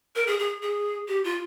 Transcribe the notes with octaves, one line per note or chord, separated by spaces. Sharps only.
A#4
G#4
G#4
G#4
G4
F4